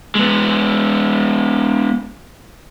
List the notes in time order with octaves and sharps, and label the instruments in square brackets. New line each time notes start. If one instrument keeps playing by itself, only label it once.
[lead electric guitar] G#3 B3